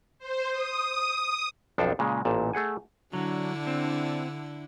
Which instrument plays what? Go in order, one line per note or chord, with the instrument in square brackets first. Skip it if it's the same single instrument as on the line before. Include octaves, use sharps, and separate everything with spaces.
[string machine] C5
D#6
[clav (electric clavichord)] B1 F2 F3 D4 A4 C5
A#2 C#3 G#3
A1 A#2 A5
A3 G#4 F#5 G#5
[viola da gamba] D3 D4 E4 [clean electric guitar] F#3
[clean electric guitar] C4